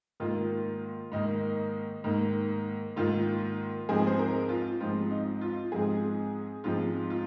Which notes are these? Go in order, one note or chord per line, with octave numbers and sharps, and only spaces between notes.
G#2 D#3 A#3 F4
G#2 D#3 A#3 D#4
G#2 D#3 A#3
G#2 D#3 A#3 F4
G#2 F3 G#3 C4 G#4
C5
A#4
F4
G#2 F3 G#3 C4 F4
D#4
F4
G#2 F3 G#3 C4 G#4
G#2 F3 G#3 C4 F4
F4